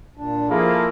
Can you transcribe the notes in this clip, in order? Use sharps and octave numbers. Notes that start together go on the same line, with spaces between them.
A#2 D4
F3 A#3 E4 F4 G#4 A4